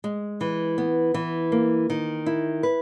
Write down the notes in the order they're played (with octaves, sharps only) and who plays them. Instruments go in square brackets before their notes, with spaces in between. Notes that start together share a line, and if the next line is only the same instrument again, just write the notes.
[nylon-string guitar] G#3
E3
B3
E3
A#3
D#3
E4
B4